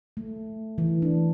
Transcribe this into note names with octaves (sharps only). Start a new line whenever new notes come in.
A3
E3
D4